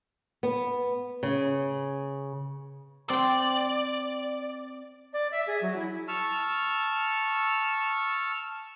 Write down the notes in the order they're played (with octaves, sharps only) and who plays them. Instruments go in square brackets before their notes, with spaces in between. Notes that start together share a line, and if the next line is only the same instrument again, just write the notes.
[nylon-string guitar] B3
C#3
[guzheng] C4 G5 [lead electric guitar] D5
[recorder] D5
E5
G#4
F#3
E4
[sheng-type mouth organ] A5 C#6 E6 F6